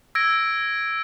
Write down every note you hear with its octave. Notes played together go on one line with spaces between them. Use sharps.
E6 G#6 A#6 D7